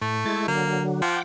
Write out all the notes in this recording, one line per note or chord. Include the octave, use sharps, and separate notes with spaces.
A2 A3
G#3 E4 A6
D3 F#3 A#3
F3 F#5 G5 D6